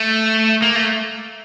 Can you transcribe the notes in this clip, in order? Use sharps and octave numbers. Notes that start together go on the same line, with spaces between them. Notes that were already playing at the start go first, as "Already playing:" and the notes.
Already playing: A3
A#3
A3